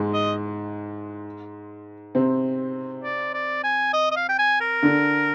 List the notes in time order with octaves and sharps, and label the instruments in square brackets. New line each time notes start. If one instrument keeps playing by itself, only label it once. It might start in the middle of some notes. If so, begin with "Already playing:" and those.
Already playing: [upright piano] G#2 G#3
[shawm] D#5
[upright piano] C3 C4
[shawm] D5
D5
G#5
D#5
D#5
F5
G5
G#5
A#4
[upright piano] D3 D4